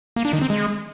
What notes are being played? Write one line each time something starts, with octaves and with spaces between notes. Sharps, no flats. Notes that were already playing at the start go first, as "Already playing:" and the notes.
A#3
D4
D#3
C4
G#3